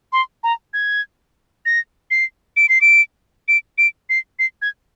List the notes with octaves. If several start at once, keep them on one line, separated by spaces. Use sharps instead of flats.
C6
A#5
G#6
A#6
C7
D7
C7
D7
D7
D7
C7
C7
G#6